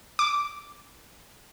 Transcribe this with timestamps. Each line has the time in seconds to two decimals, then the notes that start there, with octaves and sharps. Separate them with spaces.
0.19 D6